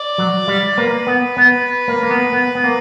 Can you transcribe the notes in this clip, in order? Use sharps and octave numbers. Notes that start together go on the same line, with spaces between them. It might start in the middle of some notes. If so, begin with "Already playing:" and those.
Already playing: D5
F#3
G3
A#3 B4
B3
B3
A#3
A#3
B3
B3
B3
A#3